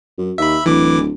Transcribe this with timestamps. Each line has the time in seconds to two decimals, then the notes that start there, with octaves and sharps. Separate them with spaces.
0.18 F#2
0.38 D#2 E5 B5
0.66 D1 E3 D6